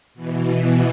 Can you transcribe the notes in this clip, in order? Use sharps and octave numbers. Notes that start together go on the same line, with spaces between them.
B2 E3